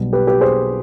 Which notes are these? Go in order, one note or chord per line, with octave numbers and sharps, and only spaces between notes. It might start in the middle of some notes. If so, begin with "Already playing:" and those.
Already playing: B1 B2 G3
G4 B4
G4 B4
G#4 C5